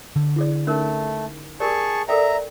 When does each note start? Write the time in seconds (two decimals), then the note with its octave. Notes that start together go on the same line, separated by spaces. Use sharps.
0.16 D3
0.36 E4 G#4 D5
0.67 A3 C#4 D#4 A#4
1.60 G4 G#4 A#4 D5 A5 C#6
2.08 A4 A#4 D5 E5 G5 A#5